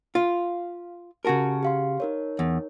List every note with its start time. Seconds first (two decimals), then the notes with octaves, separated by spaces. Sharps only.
0.15 F4 F5
1.25 C#3 F#4 G4 A#4 A5 C#6
1.63 G4 F5 C6
2.00 D#4 A#4 C#5
2.39 E2